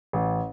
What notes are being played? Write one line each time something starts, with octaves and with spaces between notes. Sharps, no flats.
A1